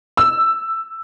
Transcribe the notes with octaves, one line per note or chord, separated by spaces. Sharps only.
E6